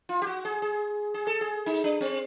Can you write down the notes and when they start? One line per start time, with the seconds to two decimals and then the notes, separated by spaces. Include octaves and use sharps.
0.09 F4
0.22 G4
0.27 F#4
0.45 G#4
0.62 G#4
1.14 G#4
1.27 A4
1.41 G#4
1.66 D#4
1.84 D4
2.01 C4